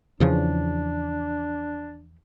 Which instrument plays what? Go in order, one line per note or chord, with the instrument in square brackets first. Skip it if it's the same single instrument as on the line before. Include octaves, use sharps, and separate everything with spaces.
[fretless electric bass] E2 C#3 F3 [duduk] D4